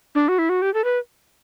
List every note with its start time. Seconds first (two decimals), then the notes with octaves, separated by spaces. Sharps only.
0.15 D4
0.28 F#4
0.39 E4
0.49 F#4
0.62 G4
0.74 A4
0.84 B4